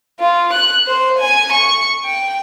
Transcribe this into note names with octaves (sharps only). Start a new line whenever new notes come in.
F4
F#6
C5
G#5
C#6
G5